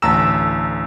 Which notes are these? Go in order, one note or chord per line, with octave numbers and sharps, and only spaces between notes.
A1 D2 A5 A#5 E6 E7